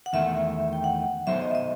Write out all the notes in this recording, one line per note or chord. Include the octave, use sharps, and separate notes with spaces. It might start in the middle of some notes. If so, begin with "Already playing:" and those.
F#5
E2 D#3 A3 E5
G5
F#5
F#3 B3 D#4 A4 C5 E5
D#5
E5
D#5